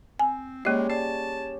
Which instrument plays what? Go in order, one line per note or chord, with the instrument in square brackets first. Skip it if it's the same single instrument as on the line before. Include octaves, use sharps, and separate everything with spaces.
[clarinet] C4 [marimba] G#5
[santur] G3 C#4 G#4 [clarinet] G#3 [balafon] A#3 D#5
[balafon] D5 [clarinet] A5